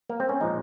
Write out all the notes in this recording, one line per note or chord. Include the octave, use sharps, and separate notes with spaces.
A#3
C4
C#4
A#2 F3 G#3 D#4